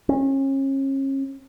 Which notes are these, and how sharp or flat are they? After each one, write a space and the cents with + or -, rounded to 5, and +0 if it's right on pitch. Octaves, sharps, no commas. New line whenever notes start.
C#4 -35